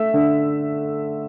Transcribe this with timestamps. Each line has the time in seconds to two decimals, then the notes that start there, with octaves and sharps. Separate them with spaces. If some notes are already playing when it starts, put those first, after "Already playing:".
Already playing: A3 E5
0.14 D3